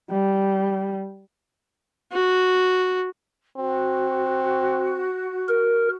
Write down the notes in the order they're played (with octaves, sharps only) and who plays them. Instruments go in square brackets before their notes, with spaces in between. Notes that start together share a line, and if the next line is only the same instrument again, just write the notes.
[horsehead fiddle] G3
[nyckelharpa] F#4
[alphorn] C4 [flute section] F#4
[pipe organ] A#4